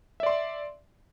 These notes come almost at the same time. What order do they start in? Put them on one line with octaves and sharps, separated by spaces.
E5 D5 C6